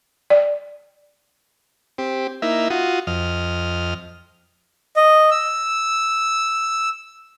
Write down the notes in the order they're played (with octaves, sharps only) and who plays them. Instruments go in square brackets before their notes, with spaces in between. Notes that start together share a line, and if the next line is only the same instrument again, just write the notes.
[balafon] D5
[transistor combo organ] C4 G4
A#3 D#4 E4 E5
F4 F#4 D#6
F2 D#5 F6
[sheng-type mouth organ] D#5
E6